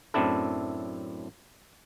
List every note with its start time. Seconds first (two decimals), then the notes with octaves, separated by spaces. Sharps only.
0.14 F#2 A2 C4 D4 E4 A4